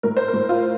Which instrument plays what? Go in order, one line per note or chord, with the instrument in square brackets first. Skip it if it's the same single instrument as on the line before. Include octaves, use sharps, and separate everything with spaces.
[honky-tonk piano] A2 A#4
C5
A#4
A2
F4